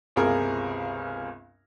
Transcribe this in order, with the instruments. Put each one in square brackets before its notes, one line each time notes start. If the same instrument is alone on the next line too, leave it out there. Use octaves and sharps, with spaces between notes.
[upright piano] G1 C#2 C3 G#4 A#4